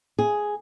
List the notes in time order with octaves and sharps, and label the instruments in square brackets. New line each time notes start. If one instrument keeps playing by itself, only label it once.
[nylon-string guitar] G#4